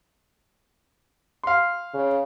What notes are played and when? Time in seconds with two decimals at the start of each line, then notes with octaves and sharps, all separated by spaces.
1.44 F5 C6
1.94 C#3